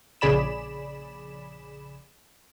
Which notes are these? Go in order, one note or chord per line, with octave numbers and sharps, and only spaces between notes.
A#1 C#3 G#4 D5 B5 E7